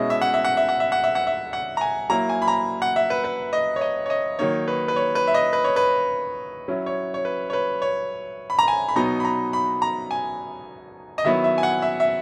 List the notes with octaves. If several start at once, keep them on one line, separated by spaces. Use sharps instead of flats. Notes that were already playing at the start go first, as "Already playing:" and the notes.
Already playing: B2 G#3 C#4 E4 D#5
E5
F#5
E5
F#5
E5
F#5
E5
F#5
E5
F#5
E5
F#5
A#5
G#5
F#3 A#3 E4 A#5
G#5
B5
A#5
F#5
E5
B4
B4
D#5
C#5
D#5
C#5
D#5
D#3 F#3 A#3 D#4 C#5
B4
B4
C#5
B4
E5
D#5
B4
C#5
B4
F#3 C#4 E4
C#5
C#5
B4
C#5
B4
C#5
B5
A#5
G#5
B5
B2 F#3 B3 D#4 A#5
B5
A#5
B5
A#5
G#5
D#5
D#3 F#3 B3 E4 E5
E5
G#5
F#5
E5
E5